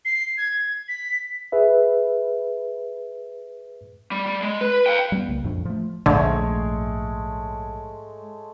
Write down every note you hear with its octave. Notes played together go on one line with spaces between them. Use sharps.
C7
G#6
B6
G#4 B4 E5
G3
G3
G#3
B4
F5 G5
G3 G#3 A#3 B3
C2 C#3 A#3
F2 A2 F3 D4
F3 A3
A#1 D#2 G#2 D3 G#3 A3 C#5